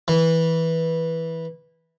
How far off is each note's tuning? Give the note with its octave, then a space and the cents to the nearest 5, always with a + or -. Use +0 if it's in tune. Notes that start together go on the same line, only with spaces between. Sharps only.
E3 -15